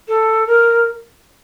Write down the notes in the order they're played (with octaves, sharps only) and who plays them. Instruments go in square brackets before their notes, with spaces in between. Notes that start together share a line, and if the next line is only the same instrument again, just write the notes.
[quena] A4
A#4